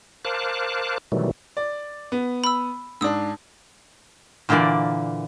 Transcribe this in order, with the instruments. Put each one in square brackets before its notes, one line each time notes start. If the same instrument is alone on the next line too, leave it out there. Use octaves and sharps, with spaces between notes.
[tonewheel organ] A#4 C5 F5 A5 D6 F#6
B2 D#3 E3 F#3 G3 A3
[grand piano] D5
B3
[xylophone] B5 E6
[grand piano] G#2 D4 [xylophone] D#6 E6
[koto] A#2 D3 E3 A#3 D5